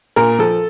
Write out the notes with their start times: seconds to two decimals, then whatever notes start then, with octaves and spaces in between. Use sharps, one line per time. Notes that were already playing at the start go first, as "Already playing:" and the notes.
0.16 A#2 A#4
0.39 F3 A4